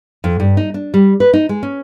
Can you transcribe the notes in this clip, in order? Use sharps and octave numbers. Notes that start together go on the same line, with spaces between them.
F2
G2
D#4
D4
G3
B4
D#4
G#3
C#4